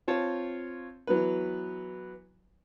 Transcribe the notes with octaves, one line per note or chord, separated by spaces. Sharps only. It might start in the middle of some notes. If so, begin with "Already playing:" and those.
C4 F4 C#5 A5
E3 F#3 B3 B4